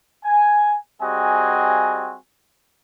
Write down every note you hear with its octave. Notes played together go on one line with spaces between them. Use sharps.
G#5
G3 C4 F#4 G#4 D#5 G#5